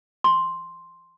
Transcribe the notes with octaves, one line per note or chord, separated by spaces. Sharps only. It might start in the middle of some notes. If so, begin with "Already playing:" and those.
C6